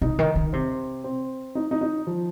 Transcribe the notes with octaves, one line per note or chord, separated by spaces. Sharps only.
C3 D#4
D#3
D#3
C3 C4
C4
D#4
D#4
D#4
F3